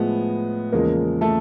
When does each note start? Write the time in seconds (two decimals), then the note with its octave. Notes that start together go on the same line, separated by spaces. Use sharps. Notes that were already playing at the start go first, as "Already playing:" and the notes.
Already playing: A2 F3 G#3 B3
0.72 E2 C#3 F3 G#3 A#3 A#4
1.21 A3 A4